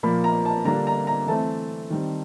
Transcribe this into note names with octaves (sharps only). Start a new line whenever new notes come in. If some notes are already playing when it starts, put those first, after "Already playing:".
A#2 F3 A#3 B5
A#5
A5
D3 G3 A#3 D4 A#5
A#5
A#5
E3 A3 C4 A5
D#3 G3 C4